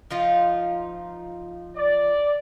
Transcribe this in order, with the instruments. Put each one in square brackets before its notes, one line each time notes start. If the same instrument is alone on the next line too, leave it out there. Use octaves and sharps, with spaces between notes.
[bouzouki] F3 D#4 F4
[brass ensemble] D5